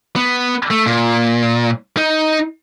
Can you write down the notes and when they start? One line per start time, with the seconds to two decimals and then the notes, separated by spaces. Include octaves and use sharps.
0.16 B3
0.70 A3
0.86 A#2
1.97 D#4